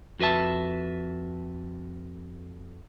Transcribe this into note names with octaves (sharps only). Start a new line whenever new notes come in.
F2 F#4 B4 E5 A5